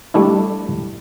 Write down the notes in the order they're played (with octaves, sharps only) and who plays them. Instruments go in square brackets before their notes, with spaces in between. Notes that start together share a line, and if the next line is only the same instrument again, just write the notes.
[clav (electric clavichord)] G3 A3 D4 E4